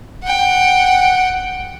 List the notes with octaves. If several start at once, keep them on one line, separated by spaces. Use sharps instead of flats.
F#5 G5